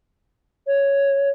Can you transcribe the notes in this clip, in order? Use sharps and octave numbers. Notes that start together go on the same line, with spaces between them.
C#5